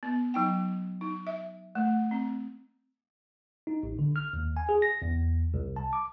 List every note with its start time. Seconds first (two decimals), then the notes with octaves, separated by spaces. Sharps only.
0.03 B3
0.34 F#3 D#4 G5
1.01 D#4
1.27 E5
1.75 A3
2.11 C4
3.67 D#4
3.83 A1
3.99 D3
4.16 F6
4.33 D#2
4.57 G#5
4.69 G#4
4.82 A#6
5.02 E2
5.54 C2
5.76 A5
5.93 D6